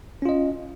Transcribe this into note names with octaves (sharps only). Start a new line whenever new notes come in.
C#4 F4 D#5